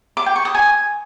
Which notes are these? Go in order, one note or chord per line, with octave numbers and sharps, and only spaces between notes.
D6
G5
C#6
D#6
G#5